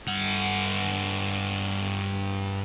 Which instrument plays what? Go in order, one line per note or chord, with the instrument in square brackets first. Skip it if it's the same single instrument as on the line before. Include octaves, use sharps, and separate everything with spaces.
[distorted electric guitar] G2 F#5